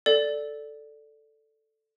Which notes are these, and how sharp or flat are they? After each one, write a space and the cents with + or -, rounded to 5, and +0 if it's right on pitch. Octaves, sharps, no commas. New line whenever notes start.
A4 +0 D5 +0